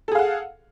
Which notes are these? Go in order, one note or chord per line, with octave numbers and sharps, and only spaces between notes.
G#4 A4 F5 F#5